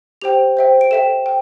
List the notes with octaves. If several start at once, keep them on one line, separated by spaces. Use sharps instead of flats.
G4 C5 G5 F7
C5 E5 G5
D7
A4 E5 G5 E7
G5